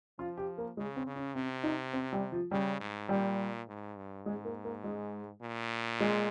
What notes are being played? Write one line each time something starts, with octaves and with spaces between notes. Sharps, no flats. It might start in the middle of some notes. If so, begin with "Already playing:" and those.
F3 F4
G4
A#3
C#3 G#3
C4
C#3
C#4
C3 C4
D#4
C4
G3
F3
C#3 G3
G#2
A#2 G3
G#2
G2
G#2 G#3
A#3
A#3
G#3
A#2
G#3